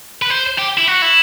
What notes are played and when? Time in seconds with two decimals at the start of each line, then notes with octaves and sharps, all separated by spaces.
0.22 B4
0.30 C5
0.58 G4
0.78 E4
0.88 F#4
1.02 E4